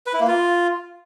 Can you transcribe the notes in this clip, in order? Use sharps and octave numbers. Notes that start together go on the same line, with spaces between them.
B4
E4
A#3
F4